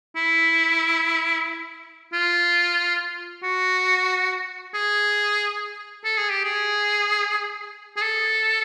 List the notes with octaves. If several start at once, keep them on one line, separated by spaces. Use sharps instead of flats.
E4
F4
F#4
G#4
A4
G#4
G4
G#4
G#4
A4